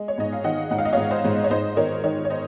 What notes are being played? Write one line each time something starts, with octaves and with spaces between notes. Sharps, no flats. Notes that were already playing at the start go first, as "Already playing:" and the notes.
Already playing: G#3
C#5
G#2 D#5
F5
D#3 D#5 F#5
G#2 F#5
F5
D#5
C#5 F5
G#2
C5 D#5
G#2
C#5
G#2 C5 D#5
D#3 A#4 C#5
D#3 A#4 C#5
C#5
C5 D#5